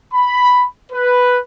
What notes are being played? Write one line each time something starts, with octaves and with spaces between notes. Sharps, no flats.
B5
B4